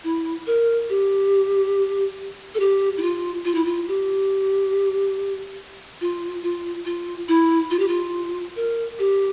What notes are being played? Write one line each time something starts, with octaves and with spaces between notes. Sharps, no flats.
E4
A#4
G4
A4
G4
E4
F4
F4
E4
F4
G4
F4
F4
F4
E4
F4
G4
F4
A#4
G4